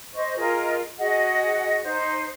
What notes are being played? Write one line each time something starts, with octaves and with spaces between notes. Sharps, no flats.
C5 D#5 C#6
F4 G#4 A#4 D#5
F#4 G#4 D#5 F#5
D#4 C5